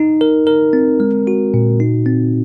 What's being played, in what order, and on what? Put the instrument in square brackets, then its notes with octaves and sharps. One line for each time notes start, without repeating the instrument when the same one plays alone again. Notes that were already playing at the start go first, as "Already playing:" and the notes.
Already playing: [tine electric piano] D#4
A#4
A#4
C4
G#3
F#4
A#2
D#4
C4